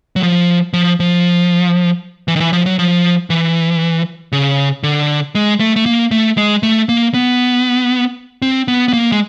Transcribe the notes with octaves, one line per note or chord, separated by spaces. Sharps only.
F#3
F3
F3
F3
E3
D#3
E3
F3
F#3
F3
E3
C#3
D3
G#3
A3
A3
A#3
A3
G#3
A3
A#3
B3
C4
B3
B3
A#3
G#3